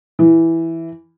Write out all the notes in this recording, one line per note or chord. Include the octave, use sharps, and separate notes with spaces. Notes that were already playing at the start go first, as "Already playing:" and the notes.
E3